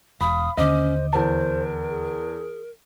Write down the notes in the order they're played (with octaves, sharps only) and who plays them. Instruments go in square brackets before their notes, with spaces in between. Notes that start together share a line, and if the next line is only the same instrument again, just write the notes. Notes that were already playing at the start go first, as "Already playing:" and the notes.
[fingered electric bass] E1 [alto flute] F5 [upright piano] B5 [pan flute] D#6
[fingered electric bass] D#2 D3 [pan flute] C#4 [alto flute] C5 [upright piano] D#5 D6
[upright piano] E2 A5 [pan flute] A#4 [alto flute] C5
[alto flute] G#4